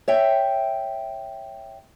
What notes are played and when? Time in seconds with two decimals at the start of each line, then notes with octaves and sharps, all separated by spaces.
0.08 C#5 E5 G5